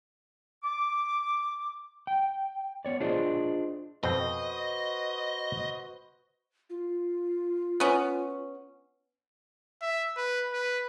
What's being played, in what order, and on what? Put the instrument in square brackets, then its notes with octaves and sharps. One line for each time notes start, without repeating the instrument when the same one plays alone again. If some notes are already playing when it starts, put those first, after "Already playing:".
[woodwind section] D6
[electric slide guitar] G5
B3 C#5 D5
D4 F4 G#4 C5 D5 D#5
[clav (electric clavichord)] F2 B2 C4 [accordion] F#4 B4 C5 [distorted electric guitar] D#5
[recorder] F4
[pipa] B3 C#4
[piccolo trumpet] E5
B4
B4